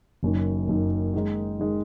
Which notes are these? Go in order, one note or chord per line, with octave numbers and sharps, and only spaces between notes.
F#1 F#2 D#3
F#1 F#2 D#3
D#3 G#3 D#4
D#3 G#3 D#4